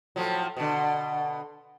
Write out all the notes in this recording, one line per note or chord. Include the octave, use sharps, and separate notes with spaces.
A2 F3 F#3
B2 D3